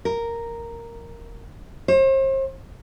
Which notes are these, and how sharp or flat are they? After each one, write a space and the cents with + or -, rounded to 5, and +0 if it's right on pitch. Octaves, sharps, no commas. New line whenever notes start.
A#4 -5
C5 +40